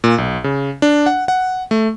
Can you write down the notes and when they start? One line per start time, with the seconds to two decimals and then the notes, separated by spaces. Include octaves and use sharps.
0.04 A#2
0.18 B1
0.44 C#3
0.82 D4
1.06 F#5
1.28 F#5
1.71 A3